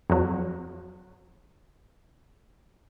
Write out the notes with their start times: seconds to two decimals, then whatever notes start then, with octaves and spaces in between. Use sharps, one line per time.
0.10 F2 F#3